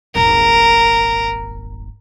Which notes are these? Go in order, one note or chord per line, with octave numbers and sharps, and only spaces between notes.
D#1 G#1 A#4